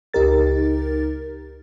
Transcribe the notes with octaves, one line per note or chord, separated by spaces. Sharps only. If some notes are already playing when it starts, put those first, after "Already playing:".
C#2 D#4 G4 A#4 A6